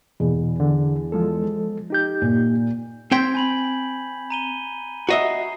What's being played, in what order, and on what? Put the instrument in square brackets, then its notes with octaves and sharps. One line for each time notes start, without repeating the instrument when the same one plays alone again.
[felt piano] E2 [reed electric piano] B2
[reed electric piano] D3
F3 G#3 A4
D#4 G4 G6
[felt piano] A#2
[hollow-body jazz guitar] C4 G5 [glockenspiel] G6 G#6 B6
[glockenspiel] G#5 B5 F#7
A#5 D#7 G7
[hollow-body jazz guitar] F#4 D#5 E5 [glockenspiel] A#5 C7